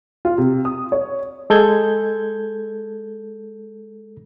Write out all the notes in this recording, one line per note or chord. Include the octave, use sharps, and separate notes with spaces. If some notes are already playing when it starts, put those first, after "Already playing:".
F4
C3
D#6
C#5
G#3 A4 G6 G#6